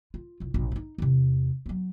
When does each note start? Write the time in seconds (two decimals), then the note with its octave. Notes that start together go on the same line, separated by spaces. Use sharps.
0.14 F4
0.40 C2 F2
0.54 A#1 B2
0.72 C#4 D#4
0.98 E2 C3
1.66 F#3 B3